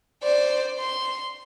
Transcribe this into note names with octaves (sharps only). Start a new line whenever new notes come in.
C5 D5
C6